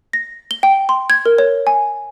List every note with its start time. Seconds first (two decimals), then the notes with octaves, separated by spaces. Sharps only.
0.13 A#6
0.51 G7
0.63 G5
0.89 C6
1.10 G#6
1.26 A#4
1.38 C#5
1.67 G#5